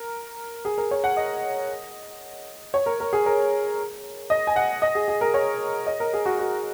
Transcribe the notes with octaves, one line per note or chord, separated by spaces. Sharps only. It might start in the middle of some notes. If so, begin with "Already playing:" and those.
Already playing: A#4
G#4
A#4
C#5
F#5
D#5
C#5
A#4
A#4
G#4
A#4
D#5
G#5
F#5
D#5
G#4
G#4
A#4
C#5
D#5
A#4
G#4
F#4
F#4